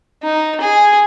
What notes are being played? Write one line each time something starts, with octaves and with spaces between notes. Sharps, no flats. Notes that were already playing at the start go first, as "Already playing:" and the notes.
D#4
G#4